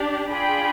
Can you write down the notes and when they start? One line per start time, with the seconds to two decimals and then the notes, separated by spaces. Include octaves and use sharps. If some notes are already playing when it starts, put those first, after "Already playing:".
Already playing: D4 G4
0.29 D4 F4 G#4 G5 B5